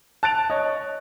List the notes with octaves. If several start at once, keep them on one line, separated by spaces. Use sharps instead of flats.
A5 F#6 A6 D7 F7
C#5 D#5